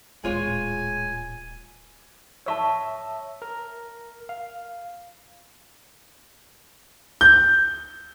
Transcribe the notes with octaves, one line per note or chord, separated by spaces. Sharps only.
D1 A#2 G#3 F4 C#5 G#5
C#5 E5 A5 C#6 E6
A#4
F5
G6